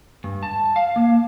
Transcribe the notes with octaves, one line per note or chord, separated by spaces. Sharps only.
G2
A5
F5
A#3